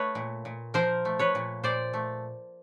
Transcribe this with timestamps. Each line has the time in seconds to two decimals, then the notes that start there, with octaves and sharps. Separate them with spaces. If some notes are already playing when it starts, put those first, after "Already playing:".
Already playing: A3 B4 C#5
0.15 A#2
0.45 A#2
0.74 F3 A#4 C5
1.05 A3
1.19 B4 C#5
1.35 A#2
1.64 A#2 C5 D5
1.93 A3